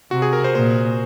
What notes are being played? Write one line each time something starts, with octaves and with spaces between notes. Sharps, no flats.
C3 F#4
G#4
A#4
C5
A#2 C5